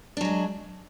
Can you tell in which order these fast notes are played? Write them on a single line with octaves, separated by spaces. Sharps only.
D4 F#3 G#3